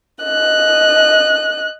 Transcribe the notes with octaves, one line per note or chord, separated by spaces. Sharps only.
D#5 F#6